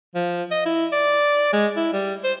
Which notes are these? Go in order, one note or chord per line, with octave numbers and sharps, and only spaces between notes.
F3
D#5
E4
D5
G#3
E4
G3
C5